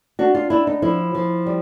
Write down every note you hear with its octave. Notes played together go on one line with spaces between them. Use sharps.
D4 F#4
F4
D4 E4
D#4
F3 E4
F3
G3